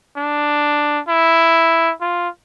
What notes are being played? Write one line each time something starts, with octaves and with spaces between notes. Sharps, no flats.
D4
E4
F4